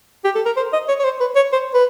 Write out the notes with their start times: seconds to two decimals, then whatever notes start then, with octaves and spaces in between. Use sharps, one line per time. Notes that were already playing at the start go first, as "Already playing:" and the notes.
0.24 G4
0.35 A4
0.45 A#4
0.56 C5
0.73 D#5
0.88 C#5
0.99 C#5
1.04 C5
1.20 B4
1.36 C#5
1.52 C5
1.74 B4